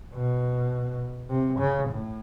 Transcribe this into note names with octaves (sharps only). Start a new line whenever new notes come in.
B2
C3
C#3
A2